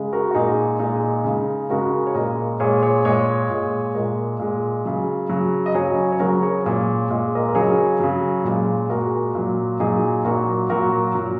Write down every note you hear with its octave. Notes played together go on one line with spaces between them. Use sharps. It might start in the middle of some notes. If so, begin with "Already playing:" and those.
Already playing: C#3 G#3
F#4 A#4
F#4
A#2 G#3 D#4 G#4
A#2 G#3 D#4 G#4
C#3 G#3
C#3 G#3 F#4 A#4
C#5
A#2 G#3 A#4 D#5
A#2 G#3 G#4 C#5
G#4 C#5
A#2 G#3 G#4 C#5
A#2 G#3
A#2 G#3 A#4 D#5
A#2 G#3
C#3 F#3
C#3 F#3
D#5
C#3 F#3 G#4 C#5
C#5
C#3 F#3 F#4 A#4
G#4 C#5
A#2 G#3 G#4 C#5
A#2 G#3 D#5
A#4 D#5
A#4
C#3 F#3 G#4 C#5
C#3 F#3
A#2 G#3
A#2 G#3 F#4 A#4
A#2 F#3
A#2 F#3 D#4 G#4
A#2 F#3 F#4 A#4
A#2 F#3 F#4 A#4
A#2 F#3